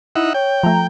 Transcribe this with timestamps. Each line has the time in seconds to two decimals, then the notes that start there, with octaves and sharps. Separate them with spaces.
0.16 D#4 E4 E5 F#5
0.34 C#5 G5
0.63 F3 A3 A#5